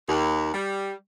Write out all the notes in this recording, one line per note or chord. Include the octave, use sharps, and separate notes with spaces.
D#2
G3